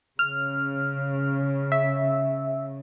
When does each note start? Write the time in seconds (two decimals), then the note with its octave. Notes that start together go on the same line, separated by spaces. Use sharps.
0.19 C#3 F6
1.72 E5